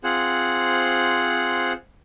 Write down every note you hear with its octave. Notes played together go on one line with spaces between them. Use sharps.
C4 F4 G#4 C5 F#5